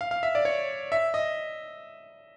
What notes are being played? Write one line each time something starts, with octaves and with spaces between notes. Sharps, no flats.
F5
F5
E5
D5
C#5
E5
D#5